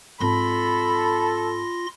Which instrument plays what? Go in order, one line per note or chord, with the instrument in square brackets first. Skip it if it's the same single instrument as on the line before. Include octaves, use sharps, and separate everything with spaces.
[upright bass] G#2 C4 [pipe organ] F4 C6 A#6 [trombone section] A4 [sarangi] B5